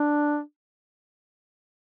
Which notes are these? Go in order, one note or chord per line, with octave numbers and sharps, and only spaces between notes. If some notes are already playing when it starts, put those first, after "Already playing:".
Already playing: D4